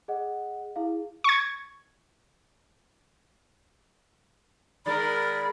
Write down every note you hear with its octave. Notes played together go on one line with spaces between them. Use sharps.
G#4 D#5 F#5
E4 G#4 F5
C#6 G#6
D#3 G#3 A#4 D5 B5